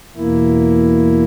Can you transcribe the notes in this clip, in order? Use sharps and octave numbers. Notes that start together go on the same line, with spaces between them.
E2 B2 A#3 E4